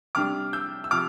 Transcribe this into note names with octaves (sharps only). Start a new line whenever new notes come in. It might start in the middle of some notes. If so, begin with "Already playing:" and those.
C3 G3 D4 D6 F6
E6 G6
E6
C3 F3 D6 F6